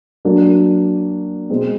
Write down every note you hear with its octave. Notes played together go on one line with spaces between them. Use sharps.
F#3 A#3 D4
B2 G#3 C4